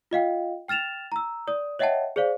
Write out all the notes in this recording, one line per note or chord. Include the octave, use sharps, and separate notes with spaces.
F4 D#5 F5 G5
G5 F6 A6 E7 F7
A#5 E6
D5 D#6
C#5 D#5 E5 F#5 G5 A5
G#4 C5 D5 F5